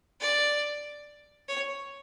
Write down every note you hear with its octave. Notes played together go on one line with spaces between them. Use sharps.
D5
C#5